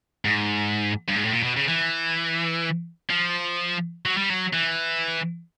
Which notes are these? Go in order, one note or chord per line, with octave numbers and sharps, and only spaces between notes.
G#2
G2
G#2
A2
A#2
B2
C#3
E3
F3
F#3
G3
F#3
E3